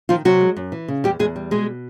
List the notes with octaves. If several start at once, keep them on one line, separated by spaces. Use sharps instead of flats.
D#3 F3 F4
C3 F#3 F#4
G#3
F#2
E3
C#3
E2 G3 G4
E2 G#3 G#4
G3
B2 G#3 G#4